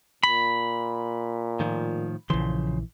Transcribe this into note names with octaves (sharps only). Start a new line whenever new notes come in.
A#2 B5
A2 D#3 F3
A#1 C#3 E3 F3 C6